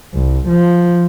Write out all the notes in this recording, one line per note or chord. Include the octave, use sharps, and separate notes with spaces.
C2
F3